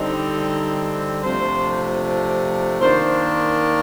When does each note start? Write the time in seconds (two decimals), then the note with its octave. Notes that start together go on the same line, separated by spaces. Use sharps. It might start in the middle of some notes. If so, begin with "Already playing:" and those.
Already playing: D3 G3 C4 D#4
1.24 C3 F3 A3 D4 C5
2.81 D#3 A#3 D4 C5